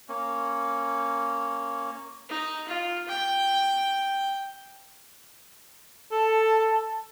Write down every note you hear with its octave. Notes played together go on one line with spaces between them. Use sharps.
A#3 C#4
D#4
F4
G5
A4 A5